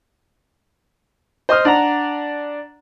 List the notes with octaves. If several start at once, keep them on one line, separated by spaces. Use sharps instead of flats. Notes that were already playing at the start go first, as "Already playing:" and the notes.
C5 D#5 C6 D#6 F6
D4 F#5 A#5